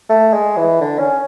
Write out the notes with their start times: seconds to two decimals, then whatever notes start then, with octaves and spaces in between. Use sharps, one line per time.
0.10 A3
0.33 G#3
0.57 E3
0.81 D3
0.99 C#4